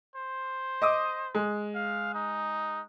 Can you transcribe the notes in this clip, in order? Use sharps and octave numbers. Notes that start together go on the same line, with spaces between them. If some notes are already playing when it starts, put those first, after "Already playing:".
C5
D#5 D6 D#6
G#3
F5
D#4